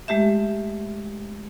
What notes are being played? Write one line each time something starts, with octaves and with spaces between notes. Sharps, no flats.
G#3 A3 G4 E5